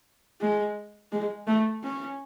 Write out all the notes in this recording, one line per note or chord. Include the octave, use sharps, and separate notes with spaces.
G#3
G#3
A3
C#4